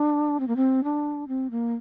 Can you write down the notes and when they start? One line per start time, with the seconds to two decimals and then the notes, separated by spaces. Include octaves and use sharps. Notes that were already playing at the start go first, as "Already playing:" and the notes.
Already playing: D4
0.40 C4
0.48 A#3
0.56 C4
0.84 D4
1.28 C4
1.51 A#3